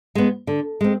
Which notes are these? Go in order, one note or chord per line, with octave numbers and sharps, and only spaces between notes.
G#3 B3
D3
G#3 C4